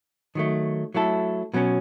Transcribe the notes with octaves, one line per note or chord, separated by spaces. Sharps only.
D#3 F#3 A3
F#3 A3 E4 A4
B2 F#3 C#4